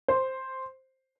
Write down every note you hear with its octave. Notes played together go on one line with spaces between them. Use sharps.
C5